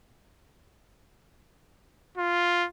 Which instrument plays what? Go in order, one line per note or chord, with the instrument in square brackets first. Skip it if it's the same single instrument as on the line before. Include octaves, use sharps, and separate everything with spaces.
[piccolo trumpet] F4